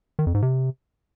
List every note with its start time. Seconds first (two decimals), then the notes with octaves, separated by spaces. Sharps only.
0.19 D#3
0.27 F2
0.34 G#2
0.42 C3